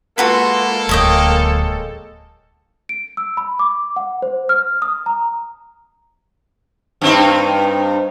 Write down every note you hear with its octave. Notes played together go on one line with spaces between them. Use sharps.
G#3 A#3 F4 F#4 A4 B4
D1 C#5 D#5 G5
D7
E6
B5
D6
F#5
C5
F6
D#6
A#5
G2 C4 D#4